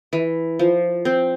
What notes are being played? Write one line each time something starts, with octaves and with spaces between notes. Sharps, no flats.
E3
F3
C4